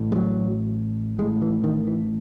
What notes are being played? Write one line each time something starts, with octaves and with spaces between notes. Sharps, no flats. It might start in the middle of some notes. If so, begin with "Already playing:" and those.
Already playing: A1 A2
G#3
F#3
A1 A2 G#3
E3
D#3
E3